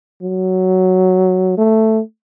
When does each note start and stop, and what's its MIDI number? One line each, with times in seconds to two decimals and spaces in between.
0.22 1.57 54
1.58 2.00 57